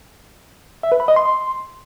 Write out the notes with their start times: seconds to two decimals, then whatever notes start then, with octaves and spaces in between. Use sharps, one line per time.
0.83 E5
0.92 B4
1.00 B5
1.08 D#5
1.16 C6